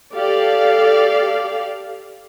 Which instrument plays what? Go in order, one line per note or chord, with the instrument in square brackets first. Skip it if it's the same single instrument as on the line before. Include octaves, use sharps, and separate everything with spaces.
[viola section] G4 A4 D5 F5